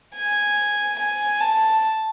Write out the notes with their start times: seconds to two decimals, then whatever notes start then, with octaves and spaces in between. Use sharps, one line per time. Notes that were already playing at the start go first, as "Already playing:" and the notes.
0.15 G#5
0.98 G#5
1.41 A5